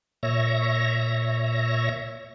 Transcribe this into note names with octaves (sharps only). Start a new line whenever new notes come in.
A#2 C#5 E5 A#6